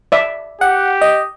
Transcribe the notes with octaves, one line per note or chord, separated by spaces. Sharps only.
D5 E5
G4 F#5
D#5